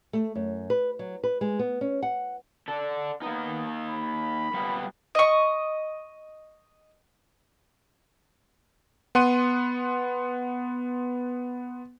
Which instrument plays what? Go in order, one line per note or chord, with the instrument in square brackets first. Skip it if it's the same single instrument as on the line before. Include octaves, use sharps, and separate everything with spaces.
[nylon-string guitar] A3
F#2
B4
F#3
B4
G#3
B3
C#4
F#5
[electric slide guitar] D4 A4
[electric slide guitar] A#3 D#4 [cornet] B3
[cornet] B5
[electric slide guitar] G3 A#3 B3
[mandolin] D#5 C#6
[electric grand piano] B3 F#5 C6 D#7